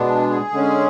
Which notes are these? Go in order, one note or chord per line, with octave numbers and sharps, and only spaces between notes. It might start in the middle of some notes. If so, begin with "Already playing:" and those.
Already playing: B2 G#3 B3 D4
G#4
D3 G#3 C#4